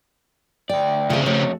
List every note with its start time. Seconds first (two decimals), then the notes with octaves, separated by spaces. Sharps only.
0.69 D2 D5 G5
1.10 C#3 C4 F4 G#4
1.26 F2 A3 F#4 C#5